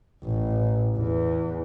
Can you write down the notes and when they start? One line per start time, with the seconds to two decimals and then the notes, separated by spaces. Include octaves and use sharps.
0.24 A1
0.97 E2